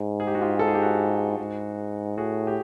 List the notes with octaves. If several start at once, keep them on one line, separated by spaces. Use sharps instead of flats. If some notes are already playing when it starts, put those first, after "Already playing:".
Already playing: G#2
G#4
G4
F#4
F4 G4
A4
G#4
G4
F#4 G#4
G#2
A2 F#4 G#4
G4